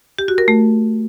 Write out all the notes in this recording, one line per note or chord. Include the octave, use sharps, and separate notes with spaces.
G4
F#4
A#4
A3